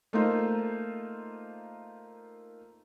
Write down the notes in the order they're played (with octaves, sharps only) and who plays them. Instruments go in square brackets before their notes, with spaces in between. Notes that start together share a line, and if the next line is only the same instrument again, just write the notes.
[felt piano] A3 A#3 D#4 F4 C5